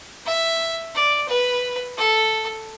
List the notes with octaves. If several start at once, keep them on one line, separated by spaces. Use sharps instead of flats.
E5
D5
B4
A4